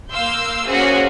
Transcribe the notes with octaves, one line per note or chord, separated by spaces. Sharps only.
A#3 F5 C6 E6 G6
A#3 C#4 F#4 G#4 C5